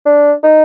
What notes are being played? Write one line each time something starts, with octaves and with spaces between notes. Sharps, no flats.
D4
D#4